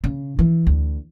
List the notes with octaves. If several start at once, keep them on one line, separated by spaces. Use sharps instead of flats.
C#3
E3
D2